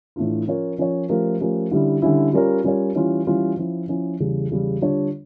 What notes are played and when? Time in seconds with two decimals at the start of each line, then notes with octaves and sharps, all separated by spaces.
0.16 A2 E3 A3 D4 F4
0.47 F3 C#4 F4 A#4 C#5
0.78 F3 C#4 F4 A#4 C#5
1.09 F3 A3 C#4 G4 A#4
1.40 F3 A3 C#4 G4 A#4
1.71 D3 G3 C#4 E4
2.02 D3 G3 C#4 E4
2.33 G3 C#4 F4 A#4 C#5
2.64 G3 C#4 F4 A#4 C#5
2.95 E3 G3 C#4 F4
3.27 E3 G3 C#4 F4
3.57 F3 C#4 E4
3.88 F3 C#4 E4
4.20 E2 C#3 G3
4.51 E2 C#3 G3
4.81 D3 G3 D4 F4 C#5